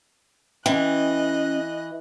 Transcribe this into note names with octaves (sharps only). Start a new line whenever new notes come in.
E3 C#4 D#5 G5 F#6